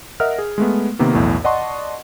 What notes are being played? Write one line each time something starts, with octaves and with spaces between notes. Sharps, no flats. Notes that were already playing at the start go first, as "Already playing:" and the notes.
A#4 D#5 E5 F#5 F6
G#4
G#3 A3 B3
C3 D#3 A#3 B3
B1 E2 A2
D5 D#5 F#5 A5 C6 C#6